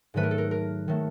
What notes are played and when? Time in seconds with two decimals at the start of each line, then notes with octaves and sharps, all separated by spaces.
0.14 G#2 D#3 F#3 A3 B4
0.23 A#4
0.31 A4
0.38 A#4
0.51 A#4
0.88 D#3 F#3 A3